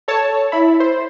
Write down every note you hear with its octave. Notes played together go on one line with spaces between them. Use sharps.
A4 C#5 A5
E4 B5
C5